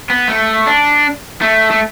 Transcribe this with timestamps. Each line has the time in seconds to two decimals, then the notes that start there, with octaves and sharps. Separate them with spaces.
0.10 B3
0.28 A3
0.67 D4
1.41 A3
1.71 A3